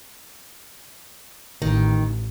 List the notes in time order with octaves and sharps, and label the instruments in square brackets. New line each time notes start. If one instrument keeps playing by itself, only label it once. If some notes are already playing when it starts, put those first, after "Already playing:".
[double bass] A1 [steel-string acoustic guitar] D#3